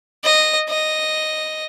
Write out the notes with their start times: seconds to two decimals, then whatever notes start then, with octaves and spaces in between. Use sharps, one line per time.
0.24 D#5
0.69 D#5